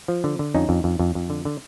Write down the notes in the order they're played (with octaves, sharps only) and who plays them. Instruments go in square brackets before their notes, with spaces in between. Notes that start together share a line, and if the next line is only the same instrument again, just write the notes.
[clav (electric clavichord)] F3
D3
D3
F2 C#4 D#4
F2
F2
F2
F2
D3
D3